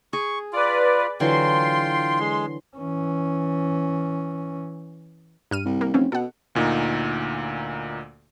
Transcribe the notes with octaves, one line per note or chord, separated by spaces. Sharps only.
G#4 C#6
F4 B4 D5
D3 E3 F#3 F4 G5 C6
G#3
E3 C#4
G2 F6 D#7
C2
A#3
F1 E3 C4 C#4
B2 A4 F#5
D2 A#2 D#4